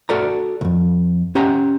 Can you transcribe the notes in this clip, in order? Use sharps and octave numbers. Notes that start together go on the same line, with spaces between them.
F#4 A4 D5 A#5
C2 F2
C#4 G4 D#5 F#5 A#5